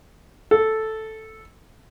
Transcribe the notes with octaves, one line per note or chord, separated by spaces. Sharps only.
A4